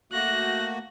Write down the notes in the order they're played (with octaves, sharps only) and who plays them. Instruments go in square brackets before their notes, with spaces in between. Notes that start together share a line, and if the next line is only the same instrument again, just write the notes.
[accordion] A3 A#3 F#4 [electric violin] F#6 A#6